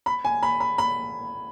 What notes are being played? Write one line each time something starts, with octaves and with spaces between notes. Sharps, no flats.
B5
G#5
B5
B5
B5